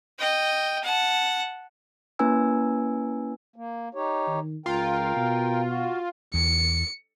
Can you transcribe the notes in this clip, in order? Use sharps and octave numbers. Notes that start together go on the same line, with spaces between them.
D#5 G5
F#5 A5
A#3 C#4 E4 B4 G#5 E6
A#3
D#4 G4 C#5
D#3
C#2 F4 A#4 G5
B2
F#4
E2 C#7